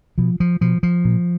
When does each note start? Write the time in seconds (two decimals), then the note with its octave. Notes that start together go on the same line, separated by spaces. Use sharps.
0.18 B2 F3
0.40 F3
0.61 B2 F3
0.83 F3
1.05 A#2